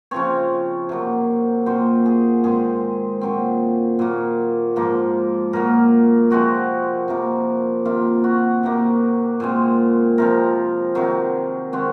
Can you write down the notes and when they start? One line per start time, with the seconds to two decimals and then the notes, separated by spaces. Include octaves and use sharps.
0.11 C#3 F3 C4 C#5
0.89 C3 F#3 A#3
1.66 A#2 F#3 C4 C5
2.06 G#4
2.44 G#2 D#3 G#3 C4 G#4
3.21 A#2 F#3 C4
3.99 A#2 F#3 A#3
4.76 G#2 F3 A#3
5.53 A#2 F#3 A#3 A#4
6.30 C3 F3 G#3 C4 F#4
7.08 C3 F3 A#3
7.85 C3 D#3 A#3 F4
8.24 F#4
8.63 C3 D#3 A#3
9.40 A#2 G#3 C4
10.18 C3 F3 C4 A#4
10.95 C3 D#3 F#3
11.73 D#3 G#3 C4 F#4